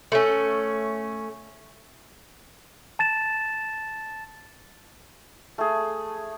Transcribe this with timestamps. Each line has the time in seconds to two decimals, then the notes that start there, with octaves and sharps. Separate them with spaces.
0.12 A3 C#4
2.99 A5 A6 E7
5.58 A3 G#4